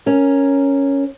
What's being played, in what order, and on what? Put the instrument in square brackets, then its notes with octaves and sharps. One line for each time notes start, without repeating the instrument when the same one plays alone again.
[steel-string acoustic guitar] C#4 A#4